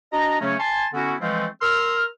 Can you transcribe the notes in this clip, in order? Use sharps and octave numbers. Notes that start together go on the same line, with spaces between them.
D4 F#4 D#5 A#5
C#3 F#3 A3 C#4
G#5 A5 C6
D3 B3 C#4 E4 F#4
E3 F3 G#3 A3 C4 F4
A#4 C6 E6 F6